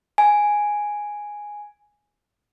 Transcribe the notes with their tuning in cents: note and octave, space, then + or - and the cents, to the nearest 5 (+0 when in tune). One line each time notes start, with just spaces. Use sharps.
G#5 +0